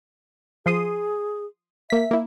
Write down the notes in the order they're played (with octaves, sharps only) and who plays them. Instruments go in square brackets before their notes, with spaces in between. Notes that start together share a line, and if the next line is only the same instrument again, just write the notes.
[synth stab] F3 C6 D#6 [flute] G#4
[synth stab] A#3 B6 [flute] E5
[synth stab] A#3 E4